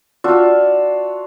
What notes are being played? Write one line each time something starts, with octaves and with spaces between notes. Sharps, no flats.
D4 F4 F#4 E5